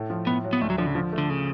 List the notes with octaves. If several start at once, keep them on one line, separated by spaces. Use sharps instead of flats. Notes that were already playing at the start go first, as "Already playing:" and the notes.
Already playing: A2 A3
F3
A2 B3
F#3
B3
D2 A3
F#3
D3 F3
C#3
F3
A3
D3
C#3